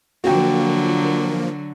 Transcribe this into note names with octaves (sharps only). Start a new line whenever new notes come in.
D3 F3 F#3 A#3 F#4 G5